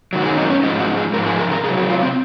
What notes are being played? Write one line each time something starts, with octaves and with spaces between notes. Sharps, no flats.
F#2 D#3 F#3 F#4
G#4
D#4
C#4
G#2 F3 G#3 D#4
F#4
G#4
G#2 F3 G#3 A#4
G#4
A#4
A#4
C3 F#3 G#4
F#4
F4
C4